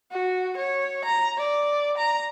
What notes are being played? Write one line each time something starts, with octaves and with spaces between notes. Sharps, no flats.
F#4
C#5
A#5
D5
A#5